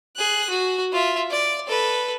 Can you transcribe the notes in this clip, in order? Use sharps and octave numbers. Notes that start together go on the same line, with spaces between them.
G#4 F#6
F#4
F4 E5
D5
A4 B4